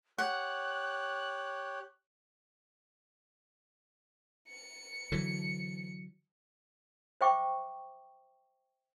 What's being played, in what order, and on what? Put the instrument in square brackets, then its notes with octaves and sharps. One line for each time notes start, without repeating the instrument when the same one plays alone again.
[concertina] G4 C#5 [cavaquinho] F#5 [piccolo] F#6
[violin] C#7
[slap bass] D3 E3 F#3
[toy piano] C5 E5 G5 C#6 D6